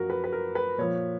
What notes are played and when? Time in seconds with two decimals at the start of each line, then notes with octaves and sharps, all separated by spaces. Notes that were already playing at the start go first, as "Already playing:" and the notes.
Already playing: F#2 F3 F#4 A#4
0.10 B4
0.24 B4
0.32 A#4
0.55 B4
0.78 A#2 F3 C#5